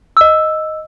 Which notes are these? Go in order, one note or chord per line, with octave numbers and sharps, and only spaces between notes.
D#5 E6